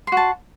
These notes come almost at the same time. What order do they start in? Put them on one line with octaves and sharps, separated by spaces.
C6 F#4 A5